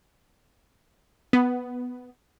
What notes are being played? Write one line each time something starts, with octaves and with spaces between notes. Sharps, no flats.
B3